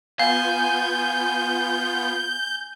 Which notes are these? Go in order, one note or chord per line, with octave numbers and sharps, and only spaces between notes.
B3 F4 F5 G#5 G6